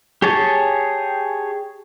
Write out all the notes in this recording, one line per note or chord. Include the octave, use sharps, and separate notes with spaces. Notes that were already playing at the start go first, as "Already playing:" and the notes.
G4 G#4 C#5 A5